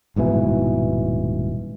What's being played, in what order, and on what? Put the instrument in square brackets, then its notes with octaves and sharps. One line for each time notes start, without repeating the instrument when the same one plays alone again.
[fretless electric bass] D#1 G#2 B2 E3